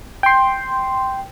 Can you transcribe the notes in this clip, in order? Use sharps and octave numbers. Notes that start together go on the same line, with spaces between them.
G5 C6